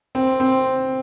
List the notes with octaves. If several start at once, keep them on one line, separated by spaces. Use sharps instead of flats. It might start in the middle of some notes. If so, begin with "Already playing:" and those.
C4
C4